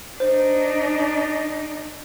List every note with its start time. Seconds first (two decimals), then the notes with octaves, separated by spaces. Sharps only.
0.20 D4 D#4 C5